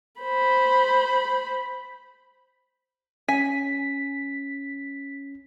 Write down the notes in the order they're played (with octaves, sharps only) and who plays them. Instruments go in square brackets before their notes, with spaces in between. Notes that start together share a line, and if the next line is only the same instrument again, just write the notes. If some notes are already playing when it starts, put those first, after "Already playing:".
[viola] C5 B5
[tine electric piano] C#4 [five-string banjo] G#5 [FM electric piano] B6